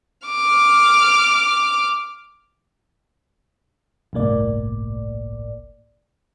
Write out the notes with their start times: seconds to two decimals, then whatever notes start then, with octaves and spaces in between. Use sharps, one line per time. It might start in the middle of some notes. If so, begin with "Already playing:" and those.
0.28 D6 F6
4.13 G1 C2 A2 A#3 D5